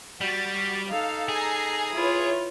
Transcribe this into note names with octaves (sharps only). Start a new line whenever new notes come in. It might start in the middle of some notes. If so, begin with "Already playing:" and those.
G3 F#4 A6
D#4 A4 F5
G#4 G#5 A#5 C7
E4 F4 B4 C#5